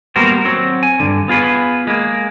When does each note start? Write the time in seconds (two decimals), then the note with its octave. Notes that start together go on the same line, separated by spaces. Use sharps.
0.16 G3 A#3 B3 F#4 A#4 C5
0.45 F#3 C4 F#4
0.83 G#5
1.00 G2 D3
1.28 B3 F4 G#4 B4
1.87 G#3 A#3